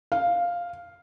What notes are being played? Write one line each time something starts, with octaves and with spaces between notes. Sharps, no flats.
F5